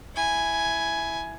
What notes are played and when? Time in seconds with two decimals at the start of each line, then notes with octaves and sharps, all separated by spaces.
0.15 E4 G#5